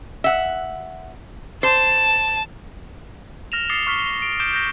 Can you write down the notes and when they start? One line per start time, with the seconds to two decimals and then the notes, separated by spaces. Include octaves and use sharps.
0.24 E5 F#5
1.63 C5 A5
3.52 F6 A#6 E7 F7
3.69 D6 D#6 A6 C7 C#7 G7
3.87 C#6 F6 B6 G7
4.22 D7
4.40 D6 G6 D7 E7 G7
4.53 G6 A#6 G7